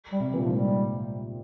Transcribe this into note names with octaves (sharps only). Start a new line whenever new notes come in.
G3
C3
E3
A#2
G#2 F3
G3